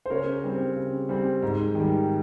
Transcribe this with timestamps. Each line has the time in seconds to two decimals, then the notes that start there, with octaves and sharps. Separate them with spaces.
0.06 C5
0.10 C#3 A#4 C#5
0.44 G3 C4
0.76 C#3
1.09 G3 C4
1.42 G#2
1.75 D#3 G3